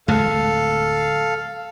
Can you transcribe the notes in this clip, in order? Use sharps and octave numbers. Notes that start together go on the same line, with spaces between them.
D1 G#3 A3 A4 F5